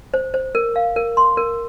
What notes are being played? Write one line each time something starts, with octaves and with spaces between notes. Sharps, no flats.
C5
C5
A#4
F5
A#4
C6
A#4